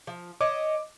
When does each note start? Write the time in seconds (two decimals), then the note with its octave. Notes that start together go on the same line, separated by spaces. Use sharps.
0.07 F3
0.41 C#5 D#5 E5 D6